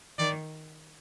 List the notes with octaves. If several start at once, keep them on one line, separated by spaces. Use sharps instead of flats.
D#3 D5